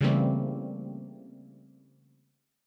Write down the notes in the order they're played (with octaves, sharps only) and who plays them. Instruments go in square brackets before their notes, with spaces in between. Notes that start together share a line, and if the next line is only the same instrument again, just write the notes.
[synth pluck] C#3 E3 G3 A3 A#3 C4